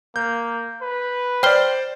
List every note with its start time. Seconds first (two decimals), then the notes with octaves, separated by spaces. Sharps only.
0.16 A#3 G6
0.82 B4
1.43 C5 D5 G5 F6 G7